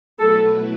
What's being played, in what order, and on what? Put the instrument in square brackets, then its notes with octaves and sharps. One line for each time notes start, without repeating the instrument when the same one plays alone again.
[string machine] B2 F#3 A3 E4 B4 [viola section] A4